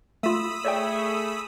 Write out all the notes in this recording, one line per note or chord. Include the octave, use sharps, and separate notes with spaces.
A3 F4 B5 D#6 E6
A3 G#4 C#5 D5 G5